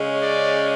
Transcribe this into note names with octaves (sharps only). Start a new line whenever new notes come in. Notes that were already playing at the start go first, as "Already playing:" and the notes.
Already playing: C#3 G#3 C#4
D5